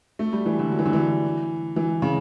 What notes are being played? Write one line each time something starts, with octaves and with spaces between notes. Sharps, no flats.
A3
G3
E3
D3
F#3
E3
D3
E3
E3
C#3